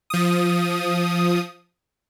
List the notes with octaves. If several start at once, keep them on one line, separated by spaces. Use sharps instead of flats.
F3 D#6